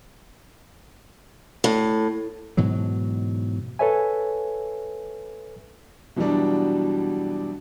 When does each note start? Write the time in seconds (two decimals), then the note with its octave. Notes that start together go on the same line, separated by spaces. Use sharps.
1.64 A2
2.57 G#2 B2 E3 F#3
3.79 A4 B4 C#5 E5 G#5
6.16 B2 E3 F#3 G3 D4